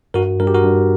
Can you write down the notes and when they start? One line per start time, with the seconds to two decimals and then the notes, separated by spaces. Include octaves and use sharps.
0.14 G2 F#4 A#4
0.40 G2 A#4
0.47 G4
0.54 F#4 A#4
0.63 G2